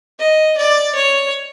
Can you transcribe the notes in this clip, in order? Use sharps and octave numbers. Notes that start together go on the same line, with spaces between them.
D#5
D5
C#5